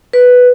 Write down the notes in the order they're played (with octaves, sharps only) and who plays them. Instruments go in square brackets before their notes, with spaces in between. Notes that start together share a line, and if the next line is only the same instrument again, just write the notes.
[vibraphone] B4